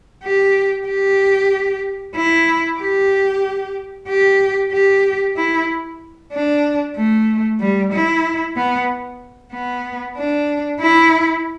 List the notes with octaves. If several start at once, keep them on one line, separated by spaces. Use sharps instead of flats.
G4
G4
E4
G4
G4
G4
E4
D4
A3
G3
E4
B3
B3
D4
E4